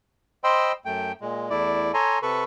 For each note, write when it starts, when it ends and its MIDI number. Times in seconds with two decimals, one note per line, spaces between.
0.44 0.72 72
0.44 0.72 75
0.44 0.72 79
0.44 0.72 83
0.44 0.72 84
0.44 0.72 88
0.85 1.12 42
0.85 1.12 57
0.85 1.12 79
1.21 1.49 46
1.21 1.49 56
1.50 1.92 40
1.50 1.92 57
1.50 1.92 64
1.50 1.92 74
1.94 2.19 69
1.94 2.19 73
1.94 2.19 80
1.94 2.19 82
1.94 2.19 84
2.22 2.44 48
2.22 2.44 69
2.22 2.44 71
2.22 2.44 83
2.22 2.44 85